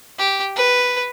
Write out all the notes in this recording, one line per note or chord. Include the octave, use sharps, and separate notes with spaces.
G4
B4